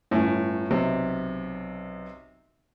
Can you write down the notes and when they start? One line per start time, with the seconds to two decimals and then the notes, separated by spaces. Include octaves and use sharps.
0.11 G1 A2 C#4
0.71 B1 C3